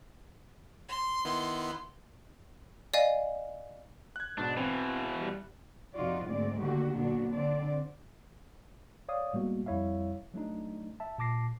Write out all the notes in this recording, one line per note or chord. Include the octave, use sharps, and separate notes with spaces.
C6
D#3 B3 E4
D5 D#5 F5 G#5
F#6 G#6
G#2 B2 D4
B2 E3 C4
G3
F2 C3 D#4 F4 F#4 D5
D2 G#2 G#3 A#3 C4 D5
D3 D#3 A#3 F#4 G4
A#2 D3 F#3 B3 D4 F#4
D3 C4 D4 D5
C#5 D5 F5 D#6
A2 G3 G#3 A#3 B3 F#4
F2 G3 E4 C#5 E5 F5
F#3 A3 D4 D#4
E5 A5
A#2 A5 D6 A#6 C7